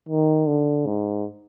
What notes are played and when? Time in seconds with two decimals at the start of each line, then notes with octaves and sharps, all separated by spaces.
0.09 D#3
0.47 D3
0.86 G#2